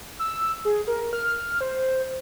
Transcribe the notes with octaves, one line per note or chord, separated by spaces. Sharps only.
E6
G#4
A#4
F6
C5